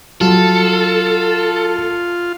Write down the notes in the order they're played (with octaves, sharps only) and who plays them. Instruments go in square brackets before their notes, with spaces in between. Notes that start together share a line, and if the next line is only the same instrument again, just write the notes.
[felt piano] F#3 [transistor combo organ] F4 [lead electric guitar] A4